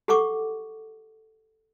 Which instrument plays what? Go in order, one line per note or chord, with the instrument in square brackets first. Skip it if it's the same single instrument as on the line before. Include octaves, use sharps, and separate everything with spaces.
[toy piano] G4 A4 F#5 C#6 D6